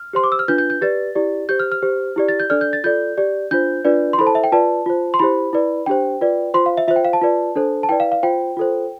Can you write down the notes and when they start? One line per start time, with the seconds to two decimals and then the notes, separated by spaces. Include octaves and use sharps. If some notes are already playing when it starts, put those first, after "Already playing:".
Already playing: F6
0.13 G4 C5 C6
0.24 D6
0.32 E6
0.39 F6
0.48 D4 F4 B4 G6
0.58 G6
0.70 G6
0.81 G4 B4 D5 A6
1.15 E4 G4 D5
1.49 G4 C5 G6
1.59 F6
1.72 F6
1.83 G4 C5
2.16 E4 G4 D5
2.28 A6
2.40 G6
2.50 D4 A4 D5 F6
2.61 G6
2.73 A6
2.84 F4 A4 D5 G6
3.18 G4 D5
3.51 D4 F4 C5 G6
3.85 D4 F4 B4 D5
4.13 C6
4.18 E4 A4 C5 B5
4.27 A5
4.35 E5
4.44 G5
4.52 F4 B4 D5 A5
4.86 F4 C5
5.14 C6
5.19 E4 G4 C5 B5
5.53 E4 B4 D5
5.86 D4 G4 C5 G5
6.21 F4 B4 D5
6.54 F4 C5 C6
6.66 F5
6.77 E5
6.88 F4 C5 E5
6.96 G5
7.05 F5
7.13 A5
7.21 F4 B4 D5
7.56 D4 A4 C5
7.83 A5
7.89 E4 B4 D5 G5
8.00 F5
8.12 F5
8.23 F4 C5 G5
8.57 F4 A4 C5